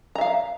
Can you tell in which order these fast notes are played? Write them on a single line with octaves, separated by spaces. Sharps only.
A#5 E5 F5